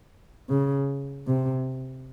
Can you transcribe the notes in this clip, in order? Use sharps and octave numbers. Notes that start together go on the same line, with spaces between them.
C#3
C3